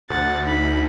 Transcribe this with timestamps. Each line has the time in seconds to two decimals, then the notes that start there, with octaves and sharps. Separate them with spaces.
0.10 D2 F#5 A6
0.46 D#4 B5